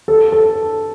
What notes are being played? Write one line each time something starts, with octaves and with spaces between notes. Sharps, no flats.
A4
A4